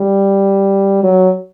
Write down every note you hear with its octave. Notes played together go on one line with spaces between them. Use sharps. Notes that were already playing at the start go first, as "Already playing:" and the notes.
Already playing: G3
F#3